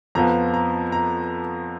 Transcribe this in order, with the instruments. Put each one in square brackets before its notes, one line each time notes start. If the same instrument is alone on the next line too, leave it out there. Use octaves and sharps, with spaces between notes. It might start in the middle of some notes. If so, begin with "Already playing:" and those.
[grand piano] F2 F3 B3 A#5
A#5
A#5